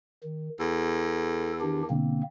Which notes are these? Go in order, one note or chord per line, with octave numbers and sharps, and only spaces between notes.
D#3
E2 A4
D#3 D4 G4
B2 D3 A#3 C4